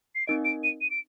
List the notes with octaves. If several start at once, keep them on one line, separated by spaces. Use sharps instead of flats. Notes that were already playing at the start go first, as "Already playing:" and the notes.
C7
C4 D#4 A#4 D#5 D7
D7
D#7
D#7
D7